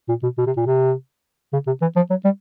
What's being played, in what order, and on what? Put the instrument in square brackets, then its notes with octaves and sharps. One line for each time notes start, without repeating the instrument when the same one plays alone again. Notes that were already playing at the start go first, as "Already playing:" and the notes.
[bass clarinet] A#2
B2
B2
C3
A#2
C3
C#3
C3
E3
F3
F#3
G3